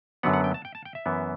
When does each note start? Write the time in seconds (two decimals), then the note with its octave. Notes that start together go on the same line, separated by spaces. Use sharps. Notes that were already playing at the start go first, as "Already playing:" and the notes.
0.23 F#2 D3 F#3 B3 F#5
0.33 F#5
0.44 G5
0.54 A5
0.65 G5
0.75 A5
0.85 G5
0.95 E5
1.06 F#2 E3 B3